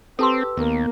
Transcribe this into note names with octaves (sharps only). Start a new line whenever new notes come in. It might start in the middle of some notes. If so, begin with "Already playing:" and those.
C4 G4 A4 B4 A5 C6 E6
D#2 A#3 B3